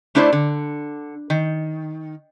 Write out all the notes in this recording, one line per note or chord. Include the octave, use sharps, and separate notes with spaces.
A3 D4 E4 C5 D5
D3
D#3